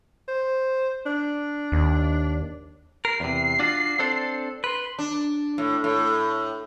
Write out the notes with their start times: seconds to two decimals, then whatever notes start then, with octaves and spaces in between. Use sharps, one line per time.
0.28 C5
1.06 D4
1.72 D#2
3.05 A#4 C7
3.20 E2 C3
3.59 D4 F4 F#4
3.99 C4 D4 A4
4.64 B4 C6
4.99 D4
5.58 A2
5.84 A2